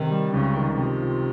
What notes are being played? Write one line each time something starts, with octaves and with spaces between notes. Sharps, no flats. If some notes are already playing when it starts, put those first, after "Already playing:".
Already playing: C3 D#3
G3
C#2 C#3
D#3
C3 F3
F4